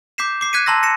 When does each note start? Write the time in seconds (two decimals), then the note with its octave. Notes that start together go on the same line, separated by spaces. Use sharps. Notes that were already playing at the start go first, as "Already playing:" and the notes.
0.18 D6 G6 B6 C7 E7
0.41 D6 C7
0.53 F#6 G#6 B6 C#7 D#7
0.66 A5 A#5 C6 E6 A#6
0.83 A#6 C#7 E7